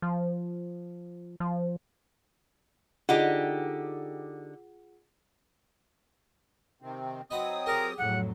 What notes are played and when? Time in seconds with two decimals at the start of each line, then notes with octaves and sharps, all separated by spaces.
0.02 F3
1.40 F3
3.09 D3 D#4 F4 G4 G#4 F#5
6.82 C3 D#3 C4
7.31 F#3 C4 D#4 B4 F#5 D#6
7.66 G4 G#4 A#4 D5
7.98 F2 A2 F#3 F#5